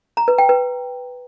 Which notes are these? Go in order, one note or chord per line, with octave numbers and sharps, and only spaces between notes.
A#5
B4
G5
B4